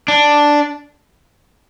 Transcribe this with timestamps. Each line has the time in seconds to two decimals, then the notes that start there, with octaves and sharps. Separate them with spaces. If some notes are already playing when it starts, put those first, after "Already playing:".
0.08 D4